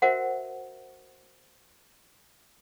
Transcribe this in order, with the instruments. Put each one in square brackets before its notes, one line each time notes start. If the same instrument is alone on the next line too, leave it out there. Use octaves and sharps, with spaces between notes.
[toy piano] F#4 A#4 C5 E5 F#5